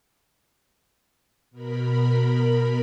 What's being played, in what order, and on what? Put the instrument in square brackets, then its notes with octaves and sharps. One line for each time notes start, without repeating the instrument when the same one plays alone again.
[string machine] B2 A#4 B5